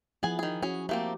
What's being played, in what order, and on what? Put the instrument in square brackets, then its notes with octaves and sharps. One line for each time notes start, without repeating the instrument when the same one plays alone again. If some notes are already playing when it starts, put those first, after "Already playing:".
[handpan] F3 E4 [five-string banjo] B3 G#4 G#5
[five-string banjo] D#3 G#4
[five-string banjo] C#4 G#4 [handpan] F#4
[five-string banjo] A3 A#3 C4 [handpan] G4